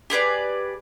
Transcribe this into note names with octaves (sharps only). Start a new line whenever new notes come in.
G4 G#4 B4 D5